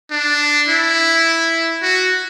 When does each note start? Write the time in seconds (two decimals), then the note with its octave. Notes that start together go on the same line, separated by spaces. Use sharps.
0.11 D4
0.68 E4
1.82 F#4